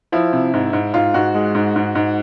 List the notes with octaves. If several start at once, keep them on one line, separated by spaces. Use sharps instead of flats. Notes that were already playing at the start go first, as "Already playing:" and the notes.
F3 E4
C3
G#2
G#2
G#2 F4
G#2 F#4
G#3
G#2
G#2
G#2